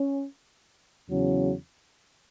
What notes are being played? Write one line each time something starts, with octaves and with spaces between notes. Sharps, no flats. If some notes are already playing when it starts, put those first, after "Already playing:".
Already playing: C#4
E2 C#3 F#3 C#4